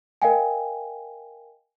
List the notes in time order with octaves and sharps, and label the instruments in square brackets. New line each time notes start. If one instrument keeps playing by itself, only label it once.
[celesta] A#4 D#5 F5 G5 G#5